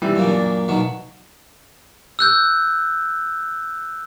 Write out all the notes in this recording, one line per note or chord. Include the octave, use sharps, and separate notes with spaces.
E3 G3
F#2 A#2 A#3
D4
B2 D#3 F#3
E6 F#6 G6